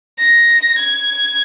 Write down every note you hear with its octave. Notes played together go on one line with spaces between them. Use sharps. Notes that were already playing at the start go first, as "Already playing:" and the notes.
A#6
G#6